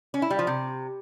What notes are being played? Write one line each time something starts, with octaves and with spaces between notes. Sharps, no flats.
C#4
E4
G3
F3
C3